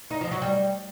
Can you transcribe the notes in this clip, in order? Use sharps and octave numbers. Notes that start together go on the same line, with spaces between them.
D#4
F3
F#3
G3